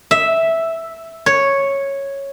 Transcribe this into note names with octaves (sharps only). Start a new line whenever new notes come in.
E5
C#5